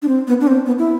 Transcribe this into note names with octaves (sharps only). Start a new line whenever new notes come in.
D4
C4
B3
D4
C4
B3
E4